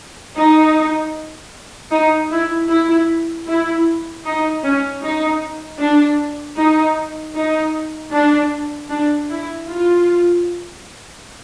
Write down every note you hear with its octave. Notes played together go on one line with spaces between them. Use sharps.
D#4
D#4
E4
E4
E4
D#4
C#4
D#4
D4
D#4
D#4
D4
D4
E4
F4